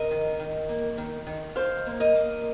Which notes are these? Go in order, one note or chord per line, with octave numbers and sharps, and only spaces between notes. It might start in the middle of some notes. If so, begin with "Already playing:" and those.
Already playing: C3 A#4 D#5
D#3
D#3
A#3
D#3
D#3
D#3 C5 F5
A#3
A#4 D#5
A#3